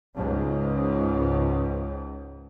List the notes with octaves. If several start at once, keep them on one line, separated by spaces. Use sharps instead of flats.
C#2 G#2